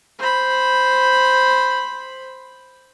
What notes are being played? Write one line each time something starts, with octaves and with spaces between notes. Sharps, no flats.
C5 B5